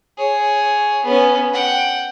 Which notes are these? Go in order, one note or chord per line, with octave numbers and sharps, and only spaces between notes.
G#4 C#5
B3 C#4
F#5 G5